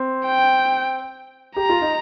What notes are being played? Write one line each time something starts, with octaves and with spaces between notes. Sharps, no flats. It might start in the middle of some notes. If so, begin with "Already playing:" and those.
Already playing: C4
G5
G4 A#5
F4
D#4